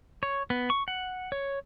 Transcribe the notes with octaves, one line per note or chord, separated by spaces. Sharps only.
C#5
B3
C#6
F#5
C#5